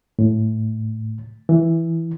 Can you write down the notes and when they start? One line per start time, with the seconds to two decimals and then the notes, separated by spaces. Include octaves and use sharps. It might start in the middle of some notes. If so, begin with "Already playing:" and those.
0.19 A2
1.49 E3